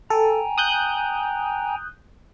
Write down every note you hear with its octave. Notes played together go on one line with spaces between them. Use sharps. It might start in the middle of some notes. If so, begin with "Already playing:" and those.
A4 G5 G#5 A#5
D#6 F#6 G6